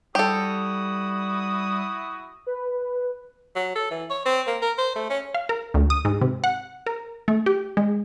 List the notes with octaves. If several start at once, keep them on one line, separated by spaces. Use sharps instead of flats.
G3 E4 F#4 G4 A4 D#6
B4
F#3
A4
E3
C#5
C4
A#3
A#4
C5
A3
C#4
F5
A#4
D2
D#6
G#2
C3
F#5
A#4
A3
G4
G#3